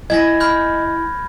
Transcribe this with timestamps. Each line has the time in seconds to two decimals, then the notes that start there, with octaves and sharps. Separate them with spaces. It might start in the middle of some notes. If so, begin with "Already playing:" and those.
0.10 E4 D#5 G#5 G#6 A#6
0.40 B5 F6 G6